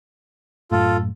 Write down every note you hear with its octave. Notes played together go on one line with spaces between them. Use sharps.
F#2 A2 F4 A4